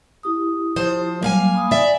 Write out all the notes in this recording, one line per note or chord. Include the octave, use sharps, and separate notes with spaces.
E4 G4 D#6
F3 C5
F#3 G3 A#3 F5 G#5
B5 D#6
D5 E5 G#5